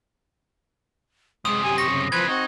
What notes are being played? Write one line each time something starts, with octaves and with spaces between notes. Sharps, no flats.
F#2 C3 G#3 D#6
G4 G#5
C#6 A#6
C#3
E3 F3 C4 B4 G#6
C4 D#4 F#4